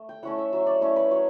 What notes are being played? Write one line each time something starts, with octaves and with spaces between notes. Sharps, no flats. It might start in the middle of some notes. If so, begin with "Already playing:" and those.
Already playing: A3
G5
A3 C#4 E4 F#5
E5
F#3 E5
D5
A3 C#4 E4 C#5
B4
F#3 C#5